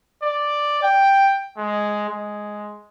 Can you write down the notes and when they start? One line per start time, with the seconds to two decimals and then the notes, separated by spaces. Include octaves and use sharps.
0.23 D5
0.83 G5
1.58 G#3
2.09 G#3